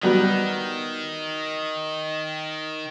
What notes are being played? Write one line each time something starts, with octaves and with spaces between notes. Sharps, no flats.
D#3 F#3 G3 B3